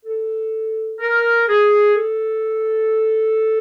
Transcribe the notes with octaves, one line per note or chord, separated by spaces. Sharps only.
A4
A#4
G#4
A4